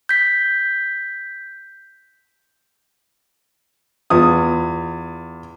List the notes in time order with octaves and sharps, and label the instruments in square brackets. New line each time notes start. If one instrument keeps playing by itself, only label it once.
[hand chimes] G6 B6
[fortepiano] E2 F4 D#6